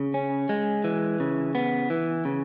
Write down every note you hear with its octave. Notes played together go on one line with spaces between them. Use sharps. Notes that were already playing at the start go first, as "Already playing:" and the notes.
Already playing: C#3
C#4
G#3
E3
C#3
B3
E3
C#3